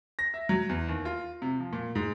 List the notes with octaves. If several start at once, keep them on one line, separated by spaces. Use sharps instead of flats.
A#6
E5
F#3
E2
D#2
F4
C3
F3
A#2
G#2